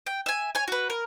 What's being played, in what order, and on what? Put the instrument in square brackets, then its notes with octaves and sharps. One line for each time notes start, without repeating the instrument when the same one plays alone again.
[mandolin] G5
E5 G#5
C#5 G#5
F#4 B4
A#4